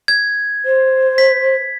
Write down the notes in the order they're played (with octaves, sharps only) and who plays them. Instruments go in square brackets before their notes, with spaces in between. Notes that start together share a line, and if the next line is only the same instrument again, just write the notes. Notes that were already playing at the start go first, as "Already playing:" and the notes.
[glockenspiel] G#6
[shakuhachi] C5
[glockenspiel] B6